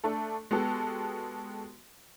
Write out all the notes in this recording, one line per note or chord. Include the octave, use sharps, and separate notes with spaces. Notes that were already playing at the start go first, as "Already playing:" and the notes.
A3 D4 A4
G#3 B3 F#4 G4 A4